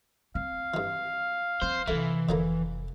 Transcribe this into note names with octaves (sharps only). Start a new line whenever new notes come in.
C4 F5
G2 E3
F3 C4 C5
F2 C3 E3 A3
F1 D3 F3 A#3